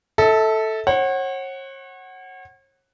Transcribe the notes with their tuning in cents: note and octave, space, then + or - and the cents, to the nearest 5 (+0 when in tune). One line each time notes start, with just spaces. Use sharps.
A4 +0 E5 -35
C#5 -40 F#5 +10